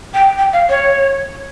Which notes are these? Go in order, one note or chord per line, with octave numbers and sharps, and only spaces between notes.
G5
G5
F5
C#5